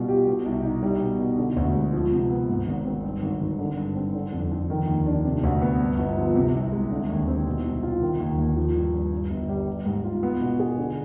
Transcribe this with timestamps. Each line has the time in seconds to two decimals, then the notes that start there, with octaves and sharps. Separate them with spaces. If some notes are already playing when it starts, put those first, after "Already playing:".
Already playing: B2 G3 F4
0.08 G4
0.27 B2
0.46 C2
0.64 D#4
0.83 G3
1.01 B2
1.19 B2
1.38 D3
1.56 D2
1.75 G#3
1.93 F3
2.12 C3
2.30 B3
2.48 G#2
2.67 G#1
2.85 C4
3.03 G2
3.22 G#1
3.41 G#1
3.59 D3
3.77 G2
3.96 C4
4.14 D3
4.33 F2
4.51 F2
4.70 D#3
4.88 D#2
5.06 D4
5.25 C3
5.43 D2
5.62 B3
5.80 G2
5.99 G1
6.17 F3
6.35 C3
6.55 C2
6.72 G#3
6.91 D3
7.09 D#2
7.28 C4
7.46 B2
7.64 C2
7.83 F4
8.02 D#3
8.20 D#2
8.38 D#2
8.57 F3
8.75 G2
8.93 G2
9.12 G2
9.30 G1
9.49 G3
9.68 G3
9.86 G#2
10.04 F4
10.23 B3
10.41 B2
10.60 G#4
10.78 D3